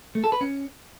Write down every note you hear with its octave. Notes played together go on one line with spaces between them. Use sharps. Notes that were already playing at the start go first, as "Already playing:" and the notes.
A3
A4
B4
C#4